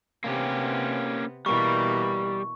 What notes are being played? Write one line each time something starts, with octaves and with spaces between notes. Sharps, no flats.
C3 A#3 B3 C#4 G4
B2 E3 G3 A#3 C#6